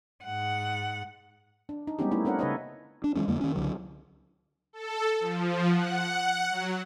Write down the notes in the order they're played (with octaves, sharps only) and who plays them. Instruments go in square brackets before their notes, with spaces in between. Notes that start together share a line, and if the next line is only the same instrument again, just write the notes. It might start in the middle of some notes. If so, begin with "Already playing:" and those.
[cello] G#2 F#5
[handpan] D4
D#4
G3 G#3 B3 C#4 D#4 G4
A3 A#3 D#4 E4
C4 D4 A#4 C#5 F#5
C#3 D#4 A4 B4 C#5 D#5
[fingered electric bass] D4
E3 G3 G#3 C#4
F2 D3 G#3 A#3
D#3 C#4
C#2 D3 F#3
[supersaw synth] A4
F3
F#5
F#5
F#3